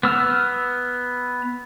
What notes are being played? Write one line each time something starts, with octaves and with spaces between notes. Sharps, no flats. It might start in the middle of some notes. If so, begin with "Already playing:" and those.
B3 E6 F6